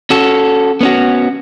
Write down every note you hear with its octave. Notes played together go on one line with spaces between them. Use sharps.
C#4 F#4 A4
B3 C#4 F#4